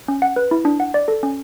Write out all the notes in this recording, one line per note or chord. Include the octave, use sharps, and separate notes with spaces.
C#4
F#5
B4
E4
D4
F#5
D5
A4
C#4